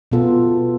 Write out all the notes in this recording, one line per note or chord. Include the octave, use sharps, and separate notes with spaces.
B2 B3 F4 A4